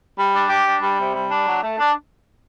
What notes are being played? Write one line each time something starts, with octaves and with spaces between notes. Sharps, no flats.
G3
D4
G4
D4
G3
C3
G3
D4
F#3
A3
D4